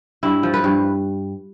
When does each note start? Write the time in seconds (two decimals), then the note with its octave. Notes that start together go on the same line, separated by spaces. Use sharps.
0.23 G2 E4
0.43 F3
0.54 B4
0.64 G2